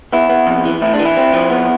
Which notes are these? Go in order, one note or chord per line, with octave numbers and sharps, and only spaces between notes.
B3 E4
B3
F2
E3
A2 E4
D4
E3
E4
C4
F3
B3